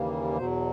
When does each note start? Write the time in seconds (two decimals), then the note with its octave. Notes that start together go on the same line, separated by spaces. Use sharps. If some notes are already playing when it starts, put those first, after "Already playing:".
Already playing: D#2 C#3 E3 G3 A#3
0.37 E2 B2 F#3 C5